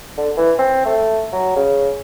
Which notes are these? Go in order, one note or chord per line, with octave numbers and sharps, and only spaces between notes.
D3
E3
C4
A3
F#3
C#3